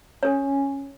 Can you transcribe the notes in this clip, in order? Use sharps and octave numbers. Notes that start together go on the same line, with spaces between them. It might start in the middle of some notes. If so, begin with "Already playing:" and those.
C#4 A4 C#5 G#5